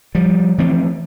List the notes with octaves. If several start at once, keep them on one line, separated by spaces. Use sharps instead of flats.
F3 G3
E3 F3 A3 C4